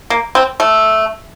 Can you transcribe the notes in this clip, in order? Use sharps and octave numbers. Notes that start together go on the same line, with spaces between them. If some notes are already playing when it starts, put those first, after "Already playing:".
A#3
C4
A3